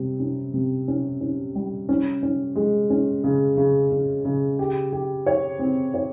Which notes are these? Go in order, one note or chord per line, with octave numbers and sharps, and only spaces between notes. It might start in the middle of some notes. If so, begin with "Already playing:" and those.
Already playing: C3 G3
C#4
C3
C#4
C#4
G3
C#4
C#4
G#3
C#4
C#3
C#3
C#3
C#3
G4
G4
C#5
C4
C#5